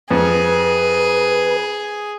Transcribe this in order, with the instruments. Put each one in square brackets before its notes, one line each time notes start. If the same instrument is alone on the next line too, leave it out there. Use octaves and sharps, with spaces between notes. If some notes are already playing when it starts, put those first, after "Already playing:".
[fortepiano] F2 [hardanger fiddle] G#4 [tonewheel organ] B4